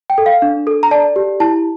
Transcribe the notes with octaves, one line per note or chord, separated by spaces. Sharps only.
G5
A4
F5
D4
A4
A#5
D5 A5
G4
E4 A5